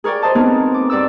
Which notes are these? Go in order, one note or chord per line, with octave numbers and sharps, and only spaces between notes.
G#4 A#4 C#5 D5 G5
C5 D#5 A5
B3 C4 D#4 G#4 A#4
D6
G2 D5 D6 E6